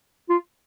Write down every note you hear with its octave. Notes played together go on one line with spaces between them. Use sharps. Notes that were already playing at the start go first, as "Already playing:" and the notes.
F4